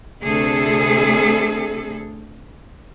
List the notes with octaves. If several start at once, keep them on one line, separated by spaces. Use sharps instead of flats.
D2 C3 G#4 A4